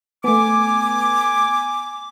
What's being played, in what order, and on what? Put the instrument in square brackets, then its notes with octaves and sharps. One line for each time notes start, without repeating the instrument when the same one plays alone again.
[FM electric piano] A3 B3 [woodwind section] G#5 D6